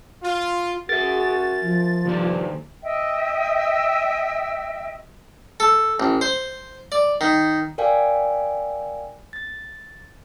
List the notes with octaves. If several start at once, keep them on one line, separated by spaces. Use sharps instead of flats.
F4
F#4 G#4 A#4 E5 A6
F3
G2 D#3 A#3 C5
D#5 E5 G5
A4
A1
C5
D5
D#3
A#4 D5 F5 G5 G#5
A6